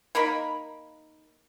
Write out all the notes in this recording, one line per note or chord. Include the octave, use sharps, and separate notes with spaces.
A#3 D#4 A#4 B5